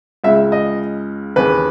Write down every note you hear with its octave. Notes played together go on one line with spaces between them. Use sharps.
C#2 C#3 G#3 E5
D#5
D#2 C#3 E3 B4